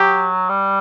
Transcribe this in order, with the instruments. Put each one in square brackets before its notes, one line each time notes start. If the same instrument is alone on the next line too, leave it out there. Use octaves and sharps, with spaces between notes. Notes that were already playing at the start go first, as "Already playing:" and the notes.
Already playing: [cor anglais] F#3 [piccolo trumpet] G4
[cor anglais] G3